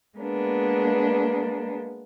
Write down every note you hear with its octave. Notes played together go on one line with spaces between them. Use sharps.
G#3 A#3 B3 D4